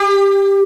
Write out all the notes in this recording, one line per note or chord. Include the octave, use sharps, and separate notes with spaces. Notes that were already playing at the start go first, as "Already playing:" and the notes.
Already playing: G4